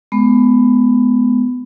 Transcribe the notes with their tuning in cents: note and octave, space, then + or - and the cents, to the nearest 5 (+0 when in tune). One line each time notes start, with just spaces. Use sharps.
G#3 +40 B3 +15